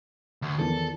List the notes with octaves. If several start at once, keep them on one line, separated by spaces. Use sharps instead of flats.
D2
E2 D#3 F3 A4